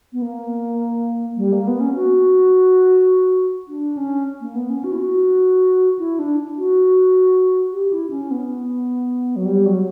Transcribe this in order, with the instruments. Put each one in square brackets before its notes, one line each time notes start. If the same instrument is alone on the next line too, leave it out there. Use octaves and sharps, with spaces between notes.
[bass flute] B3
A#3
G3
A#3
B3
C#4
F#4
D4
C#4
A#3
B3
C#4
F#4
E4
F#4
E4
D4
F#4
G4
E4
C#4
B3
F#3
G3
F#3